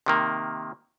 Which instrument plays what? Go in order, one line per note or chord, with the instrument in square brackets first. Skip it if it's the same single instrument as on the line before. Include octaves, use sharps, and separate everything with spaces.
[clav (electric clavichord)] C3 D#3 A#3